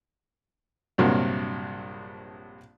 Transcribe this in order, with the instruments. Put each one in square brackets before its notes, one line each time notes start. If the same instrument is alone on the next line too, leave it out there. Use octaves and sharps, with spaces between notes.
[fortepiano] A#1 G2 C3 F#3 A#4